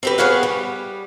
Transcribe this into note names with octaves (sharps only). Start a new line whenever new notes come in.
C4 G4 B4
B3 G#4 B4 C#5 F5 F#5
G3